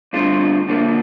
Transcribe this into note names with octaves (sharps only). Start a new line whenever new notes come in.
G2 D3 A3 C4 F4
D3 F3 A#3